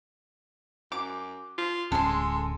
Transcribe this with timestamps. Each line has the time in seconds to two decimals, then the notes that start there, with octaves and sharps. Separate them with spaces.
0.92 F#2 D6
1.58 F4
1.92 D1 G#3 C#4 A4 C6